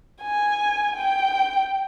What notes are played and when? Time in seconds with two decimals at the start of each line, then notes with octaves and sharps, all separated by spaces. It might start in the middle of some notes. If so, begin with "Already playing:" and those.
0.22 G#5
0.96 G5